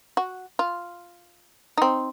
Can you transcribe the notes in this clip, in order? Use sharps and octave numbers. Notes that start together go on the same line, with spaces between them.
F#4
F4
C4 D#4